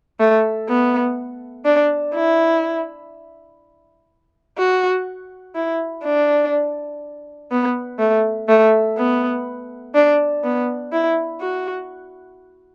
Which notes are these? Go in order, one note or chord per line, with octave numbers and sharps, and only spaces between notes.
A3
B3
D4
E4
F#4
E4
D4
B3
A3
A3
B3
D4
B3
E4
F#4